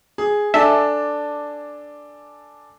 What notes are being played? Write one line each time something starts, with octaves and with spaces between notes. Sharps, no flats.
G#4
D4 A4 E5 G#5